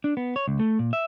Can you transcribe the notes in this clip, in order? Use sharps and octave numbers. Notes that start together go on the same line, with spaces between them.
D4
B3
C#5
C#2
A3
A#2
E5